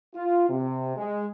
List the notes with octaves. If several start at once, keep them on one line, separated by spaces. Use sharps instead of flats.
F4
C3
G#3